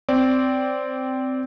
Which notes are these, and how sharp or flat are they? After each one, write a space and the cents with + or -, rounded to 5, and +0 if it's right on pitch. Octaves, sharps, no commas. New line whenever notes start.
C4 -10 D5 -15